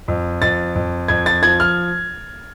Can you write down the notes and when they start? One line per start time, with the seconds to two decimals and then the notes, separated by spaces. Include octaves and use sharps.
0.08 F2
0.42 F2 A6
0.75 F2
1.08 F2 G#6
1.26 A6
1.42 F3 G#6
1.60 F6